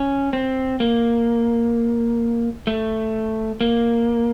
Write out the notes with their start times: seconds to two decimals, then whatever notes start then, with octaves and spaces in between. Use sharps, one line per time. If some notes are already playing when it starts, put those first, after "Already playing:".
Already playing: C#4
0.33 C4
0.80 A#3
2.67 A3
3.61 A#3